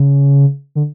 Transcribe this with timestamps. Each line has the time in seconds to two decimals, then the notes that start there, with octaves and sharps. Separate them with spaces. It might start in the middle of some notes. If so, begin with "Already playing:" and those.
Already playing: C#3
0.75 D3